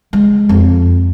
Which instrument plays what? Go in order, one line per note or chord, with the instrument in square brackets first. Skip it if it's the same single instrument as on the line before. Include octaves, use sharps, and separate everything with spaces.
[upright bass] G#3
F2